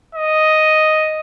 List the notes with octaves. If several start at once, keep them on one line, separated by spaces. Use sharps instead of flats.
D#5